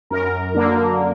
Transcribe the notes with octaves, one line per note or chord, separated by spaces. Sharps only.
F#2 A#4
D3 A#3